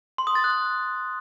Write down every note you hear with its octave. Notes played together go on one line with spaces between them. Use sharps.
C6
D#6
A6
F#6